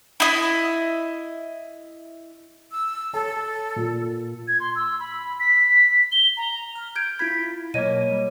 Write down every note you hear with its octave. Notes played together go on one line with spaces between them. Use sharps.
E4 D#5
E6
A4 C#5 A5
A#2
G#6
C6
E6
B5
B6
G7
A#5
F6
G6 G#6 D7
E4 F4 B5 G#6 B6
B2 F#3 A#3 C#5 D#5 D#7
G3